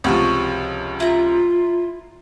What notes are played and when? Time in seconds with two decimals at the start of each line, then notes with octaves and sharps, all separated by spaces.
0.04 C#2 C3 F3 C#4 F#4 D#5
1.00 E4 F4 A#5